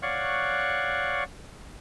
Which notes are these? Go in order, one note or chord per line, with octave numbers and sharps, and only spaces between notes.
C#5 D5 F5 F#5 C#6 F#6